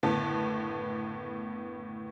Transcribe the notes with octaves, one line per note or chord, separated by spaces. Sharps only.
F#1 A2 D3 B3 A5